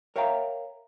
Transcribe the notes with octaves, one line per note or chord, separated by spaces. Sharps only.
A#4 C#5 E5 F5 G5 A#5